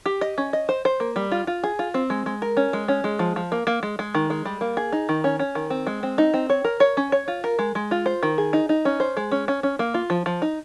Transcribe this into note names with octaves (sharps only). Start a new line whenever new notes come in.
G4
D#5
C#4
D#5
C5
C5
A#3
G3
F4
F4
G#4
F4
C4
G#3
G#3
A#4
C#4
G#3
C#4
G#3
F3
F3
A#3
A#3
G#3
G#3
D#3
G#3
G3
A#3
G#4
D#4
D#3
C#4
C#4
D#3
C4
G#3
C4
D#4
C4
C#5
A#4
C#5
C#4
C#5
F4
A#4
G#3
G#3
F4
C5
D#3
G#4
D#4
D#4
C#4
C5
G#3
C#4
C#4
C#4
A#3
F4
F3
F3
D#4